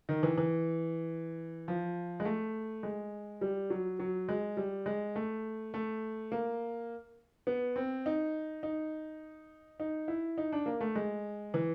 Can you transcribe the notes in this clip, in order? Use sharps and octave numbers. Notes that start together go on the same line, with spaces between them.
D#3
E3
E3
F3
G#3
A3
G#3
G3
F#3
F#3
G#3
G3
G#3
A3
A3
A#3
B3
C4
D#4
D#4
D#4
E4
D#4
D4
A#3
A3
G#3
E3